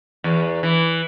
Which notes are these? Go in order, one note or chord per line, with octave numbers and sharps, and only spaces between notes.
E2
E3